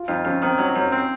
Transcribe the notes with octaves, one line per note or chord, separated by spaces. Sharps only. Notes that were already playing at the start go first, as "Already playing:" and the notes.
Already playing: F4
F2 D#4
F2 C#4
D#3 C4
F#3 D#4
F#2
C4